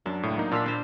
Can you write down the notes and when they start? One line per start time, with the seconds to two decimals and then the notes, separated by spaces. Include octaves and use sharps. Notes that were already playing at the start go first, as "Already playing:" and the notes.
0.06 F#2 F#3 D4
0.23 C#2 A2
0.37 F#3 A#3 D#4
0.52 A#2 D4 F5 B5 C6 E6
0.66 D4 C5